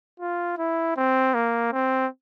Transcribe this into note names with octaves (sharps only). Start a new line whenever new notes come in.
F4
E4
C4
A#3
C4